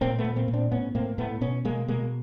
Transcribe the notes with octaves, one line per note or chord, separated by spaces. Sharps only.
A#2 A#3 C4
A3 B3
A#2
A#3 C4
A#2
C4 D4
A2 B3 C#4
A2 A#3 C4
A2 A3 B3
B2 B3 C#4
B2 G#3 A#3
B2 G#3 A#3